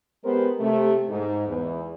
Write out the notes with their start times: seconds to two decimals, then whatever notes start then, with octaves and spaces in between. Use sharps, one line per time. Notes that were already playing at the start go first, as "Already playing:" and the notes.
0.24 G#3 B3 G4 A#4 C5
0.60 C3 A3
1.09 G#2
1.47 E2